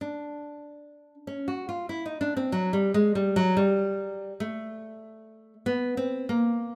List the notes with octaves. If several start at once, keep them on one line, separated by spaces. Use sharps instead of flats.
D4
C#4
F#4
F4
E4
D#4
D4
C4
F#3
G3
G#3
G3
F#3
G3
A3
B3
C4
A#3